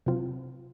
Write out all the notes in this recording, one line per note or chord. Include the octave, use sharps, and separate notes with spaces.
C3 F#3 C4 F4